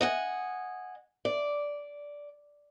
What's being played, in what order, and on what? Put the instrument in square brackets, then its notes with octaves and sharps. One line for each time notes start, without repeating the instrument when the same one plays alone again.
[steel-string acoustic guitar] D#5 F#5 G#5
D5